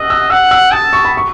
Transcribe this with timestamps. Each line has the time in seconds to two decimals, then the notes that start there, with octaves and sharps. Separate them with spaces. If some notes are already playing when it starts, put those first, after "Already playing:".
Already playing: D#5 E6 F#6
0.10 E6
0.30 F#5 E6
0.51 E6
0.72 A5 D#6
0.93 C#6
1.05 B5
1.17 C#6